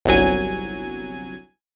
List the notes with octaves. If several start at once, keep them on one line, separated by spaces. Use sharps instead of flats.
G1 C2 F#3 G#5